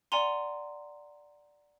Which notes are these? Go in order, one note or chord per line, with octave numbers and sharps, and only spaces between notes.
D5 F#5 G#5 A#5 C6